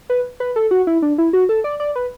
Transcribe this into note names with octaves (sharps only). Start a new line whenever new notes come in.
B4
B4
A4
F#4
E4
D4
E4
F#4
A4
D5
D5
B4